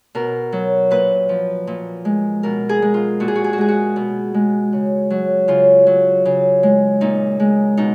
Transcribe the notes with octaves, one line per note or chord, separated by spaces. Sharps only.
B2 A#4
F#3
A#2 B4
F3
A#2
G#3
B2 A#4
G#4
G#3
F4
A#2 F#4
G#4
F#4
G#4
F#4
G#3 G#4
F#4
B2
G#3
C#3
F#3
C#3 F4
F#3
C#3
G#3
A#2 D#4
G#3
B2 D#4